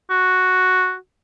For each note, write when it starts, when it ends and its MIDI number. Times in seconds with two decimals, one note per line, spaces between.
0.10 0.95 66